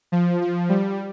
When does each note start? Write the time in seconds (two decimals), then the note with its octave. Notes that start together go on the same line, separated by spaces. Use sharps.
0.12 F3
0.41 F3
0.69 G3